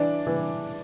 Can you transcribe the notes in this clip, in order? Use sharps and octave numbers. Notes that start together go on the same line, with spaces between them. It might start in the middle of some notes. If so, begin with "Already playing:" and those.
Already playing: E3 D4
E3